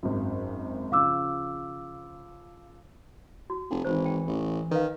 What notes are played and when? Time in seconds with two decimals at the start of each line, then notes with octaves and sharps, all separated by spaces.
0.03 G#1 F#2
0.92 C#3 F3 F5 D6 E6
3.50 F#4
3.70 F1
3.85 G#1 E3 C5
4.06 G5
4.27 A1
4.71 D#3 B4 F5